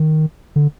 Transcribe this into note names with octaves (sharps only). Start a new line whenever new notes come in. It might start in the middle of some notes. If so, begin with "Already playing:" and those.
Already playing: D#3
D3